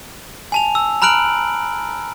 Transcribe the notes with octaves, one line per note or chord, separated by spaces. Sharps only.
G#5 A5 F7
E6
A#5 B5 F6 F#6 D7 F#7